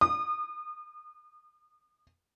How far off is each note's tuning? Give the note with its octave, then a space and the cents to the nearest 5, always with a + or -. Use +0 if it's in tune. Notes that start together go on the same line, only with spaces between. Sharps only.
D#6 -40